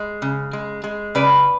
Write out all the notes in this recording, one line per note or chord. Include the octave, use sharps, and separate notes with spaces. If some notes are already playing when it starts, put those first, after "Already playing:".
Already playing: G#3
C#3
G#3
G#3
C#3 B4 D5